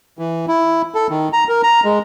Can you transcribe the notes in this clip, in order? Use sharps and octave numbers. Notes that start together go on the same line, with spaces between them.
E3
E4
A4
D#3
A#5
A#4
A#5
G#3